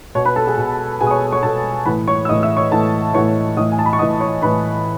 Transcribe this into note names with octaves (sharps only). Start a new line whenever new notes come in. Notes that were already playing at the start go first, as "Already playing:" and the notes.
B2 C#5 C#6
B4 B5
A4 A5
G#4 G#5
B2
B2 G#4 G#5
D#6
C#5 C#6
C#5 C#6
B2 A4 A5
A2 E3 B4 B5
C#5 C#6
E6
A2 E3 D#5 D#6
E5 E6
C#5 C#6
A2 E3 A4 A5
A2 E3 C#5 C#6
A2 E3 D#5 D#6
G#5
A5
B5
C#6
A2 E3 D#5 D#6
C#5 C#6
A2 E3 B4 B5